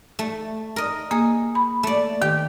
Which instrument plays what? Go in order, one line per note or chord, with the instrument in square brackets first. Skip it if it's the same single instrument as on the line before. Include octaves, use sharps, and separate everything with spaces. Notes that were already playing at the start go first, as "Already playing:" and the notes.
[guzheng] A3
A#4 D#5
[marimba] A#3 [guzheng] G#4
[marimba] B5
[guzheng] A3 D5
[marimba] D#3 [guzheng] G4 G5